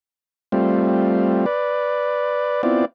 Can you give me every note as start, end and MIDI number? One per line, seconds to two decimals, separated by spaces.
0.52 1.46 55
0.52 1.46 57
0.52 1.46 60
0.52 1.46 65
1.46 2.62 71
1.46 2.62 74
2.63 2.85 59
2.63 2.85 60
2.63 2.85 64
2.63 2.85 65
2.63 2.85 74